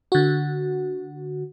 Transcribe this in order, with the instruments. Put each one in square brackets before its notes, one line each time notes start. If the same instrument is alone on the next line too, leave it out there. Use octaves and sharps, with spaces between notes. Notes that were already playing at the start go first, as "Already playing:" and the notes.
[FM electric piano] D3 F#4